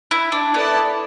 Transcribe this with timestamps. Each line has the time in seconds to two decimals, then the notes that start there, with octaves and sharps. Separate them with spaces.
0.11 E4
0.32 D4
0.53 B3 E4 A4 D5 A5